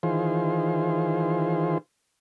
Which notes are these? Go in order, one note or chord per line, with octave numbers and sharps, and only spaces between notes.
D#3 E3 F4 G#4 C5